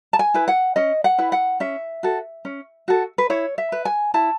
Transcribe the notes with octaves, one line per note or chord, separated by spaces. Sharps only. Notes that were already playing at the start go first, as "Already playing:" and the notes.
A5
G#5
E4 B4
F#5
C#4 D#5
F#5
E4 B4
F#5
C#4 E5
F#4 A4
C#4
F#4 A4
B4
E4 C#5
E5
B4
G#5
E4 A5